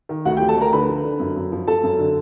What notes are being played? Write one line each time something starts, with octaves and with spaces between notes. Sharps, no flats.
D#3
D2 F#4 F#5
G4 G5
F3
A4 A5
D2 A#4 A#5
D3 B4 B5
F3
D3
F#2
F#2
F3
F3 A4 A5
F#2
D3